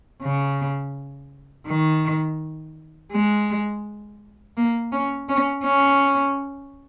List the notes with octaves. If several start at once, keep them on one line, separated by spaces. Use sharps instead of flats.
C#3
D#3
G#3
A#3
C#4
C#4
C#4